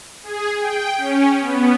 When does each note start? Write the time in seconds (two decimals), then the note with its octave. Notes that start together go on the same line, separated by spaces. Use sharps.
0.23 G#4
0.60 G5
0.98 C#4
1.40 B3